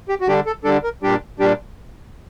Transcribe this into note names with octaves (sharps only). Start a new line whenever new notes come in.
G4
F#4
D3 G3 D4 G4
A4
D3 G3 D4 A4
A#4
A#2 G3 D4 G4
A#2 G3 D4 G4